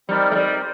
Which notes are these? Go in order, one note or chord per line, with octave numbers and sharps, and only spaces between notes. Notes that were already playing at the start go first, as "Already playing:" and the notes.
G3 C4 D#4 A#4 D5 G5
A3
G3